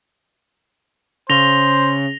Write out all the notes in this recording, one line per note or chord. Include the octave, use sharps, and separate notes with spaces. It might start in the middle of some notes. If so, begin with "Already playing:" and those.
C#3 C5 A#6 F7 G7